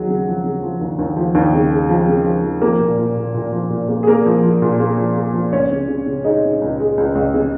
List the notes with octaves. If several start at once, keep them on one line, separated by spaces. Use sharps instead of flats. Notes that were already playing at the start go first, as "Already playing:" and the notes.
Already playing: D#2 F#3 G#3 F#4
C#3
F3
C#3
F3
D#2
D#2
F3
D#2
C#3
G#3
F3
C#3
F3
F3
F3 A#3 A#4
A#2
A#2
A#2
A#2
F3
A#2
A#3
G#4
A#3 A#4
F3
F3
A#2
A#3
F3
A#3
F3
C#2 C#4 C#5
C#3
C#3
C#3
G#3 D#4 D#5
C#3
C#2
G#3
C#2
C#2
C#3